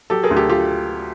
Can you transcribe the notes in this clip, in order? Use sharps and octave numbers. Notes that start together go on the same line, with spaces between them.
F#3 G4 A4
G#4 A#4
D2
G4 A4
F4 G4